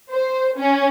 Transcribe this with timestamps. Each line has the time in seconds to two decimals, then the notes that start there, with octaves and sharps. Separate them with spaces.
0.12 C5
0.58 C#4